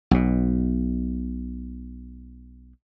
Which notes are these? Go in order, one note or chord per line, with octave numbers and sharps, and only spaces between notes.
B1 B2